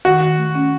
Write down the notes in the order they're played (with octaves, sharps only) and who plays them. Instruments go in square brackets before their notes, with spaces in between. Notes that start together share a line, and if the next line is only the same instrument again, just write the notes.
[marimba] D#3 [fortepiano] F#4
[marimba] D#3
A3
C#4